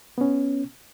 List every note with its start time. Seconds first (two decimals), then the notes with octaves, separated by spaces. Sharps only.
0.18 B3 C#4